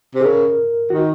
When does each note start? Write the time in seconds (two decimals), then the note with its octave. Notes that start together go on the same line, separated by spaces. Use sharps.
0.15 C3
0.21 G#4
0.25 C#3 A#4
0.90 D#3 F#4